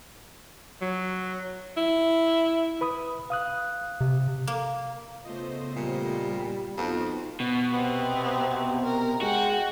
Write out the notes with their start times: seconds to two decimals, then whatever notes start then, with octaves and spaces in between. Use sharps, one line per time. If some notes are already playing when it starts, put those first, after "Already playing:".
0.81 F#3
1.77 E4
2.81 B4 B5 D#6
3.30 F5 D#6 F#6
4.01 C3
4.47 A#3
5.24 C#3 A3 B3 F4 C5 D#5
5.76 A#2 G3
6.77 F2 B3 D#4 F4 F#4 C5
7.40 B2
7.72 C3 B3 C4
8.82 A#4
9.21 G#3 F#4 F#5 G5